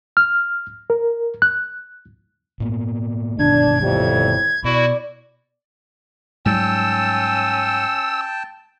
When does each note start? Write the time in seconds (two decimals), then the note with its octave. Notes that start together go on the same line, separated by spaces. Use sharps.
0.17 F6
0.90 A#4
1.42 F#6
2.60 A2 A#3 B3
3.39 G1 B2 D#3 D4 G#6
3.82 F2 A2 G3
4.64 B2 E4 F#4 D5
6.46 G#2 F#3 G3 C#4 G5 A5 E6